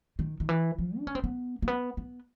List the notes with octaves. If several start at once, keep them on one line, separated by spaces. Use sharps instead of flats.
D#3
D#3
E3
F3
D4
C#4
C4
B3
A#3
B3
B3